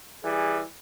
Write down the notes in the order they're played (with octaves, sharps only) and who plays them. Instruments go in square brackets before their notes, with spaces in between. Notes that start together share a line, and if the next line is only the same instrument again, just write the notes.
[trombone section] E3 G3 G#4